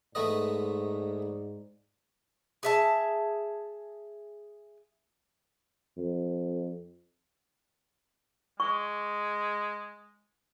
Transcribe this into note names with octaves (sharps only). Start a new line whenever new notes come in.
G#2 A3 B3 D5 D#5
G#4 E5 A5
F2
G#3 C#6